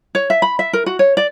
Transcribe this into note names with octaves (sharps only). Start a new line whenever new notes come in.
C#5
E5
B5
E5
A#4
F#4
C#5
D5